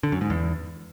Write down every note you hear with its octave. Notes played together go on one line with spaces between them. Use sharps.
D3
F#2
G#2
E2